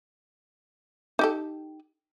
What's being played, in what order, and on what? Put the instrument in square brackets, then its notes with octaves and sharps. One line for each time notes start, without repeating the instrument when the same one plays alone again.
[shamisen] D#4 G4 A4